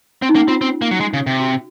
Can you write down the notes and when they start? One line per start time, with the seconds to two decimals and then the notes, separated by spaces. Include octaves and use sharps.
0.22 C4
0.29 D#4
0.35 A#3 C#4
0.48 C4 F4
0.61 C4
0.82 A#3
0.91 F#3
1.00 G#3
1.14 C#3
1.27 C3
1.40 F#4